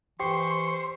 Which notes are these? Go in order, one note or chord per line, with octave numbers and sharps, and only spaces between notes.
E3 G4 C5 C6 C#6